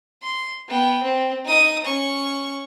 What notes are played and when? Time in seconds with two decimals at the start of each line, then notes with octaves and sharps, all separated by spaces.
0.23 C6
0.68 B3 G5
1.03 C4
1.45 D#4 D#6
1.84 C#4 C#6